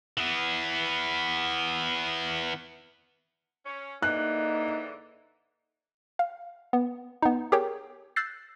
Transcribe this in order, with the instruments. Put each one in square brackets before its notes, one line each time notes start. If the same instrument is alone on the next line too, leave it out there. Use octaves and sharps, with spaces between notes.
[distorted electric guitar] E3 B3
[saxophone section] C#4
[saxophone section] G#2 D3 E3 [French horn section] A#3 D#4 [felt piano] F#6
[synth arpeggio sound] F5
B3
B3 D#4
G4 G#4 A#4 C#5 G5
E6 F#6 G6 A6 A#6 C7